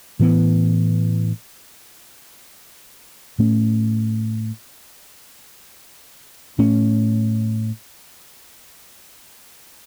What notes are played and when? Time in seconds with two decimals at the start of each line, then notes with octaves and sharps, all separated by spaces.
0.19 A2 E3 B3
3.39 A2 A3 C#4
6.58 A2 A3 C#4